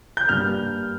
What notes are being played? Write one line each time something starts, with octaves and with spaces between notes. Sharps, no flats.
G6
G2 G3 A#3 F6